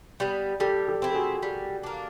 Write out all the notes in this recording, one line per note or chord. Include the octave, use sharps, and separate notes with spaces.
G3 B3
G3 G4 A4
G4 A4
C4 E4
A4
F#4 G#4
G3
A#3 D4